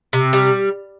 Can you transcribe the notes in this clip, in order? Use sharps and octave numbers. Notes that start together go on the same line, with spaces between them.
C3
G3